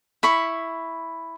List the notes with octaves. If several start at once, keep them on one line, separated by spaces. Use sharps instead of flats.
E4 B5 C#6